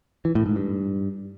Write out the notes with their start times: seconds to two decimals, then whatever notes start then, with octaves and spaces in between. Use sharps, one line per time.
0.25 E3
0.35 A2
0.46 G#2
0.56 G2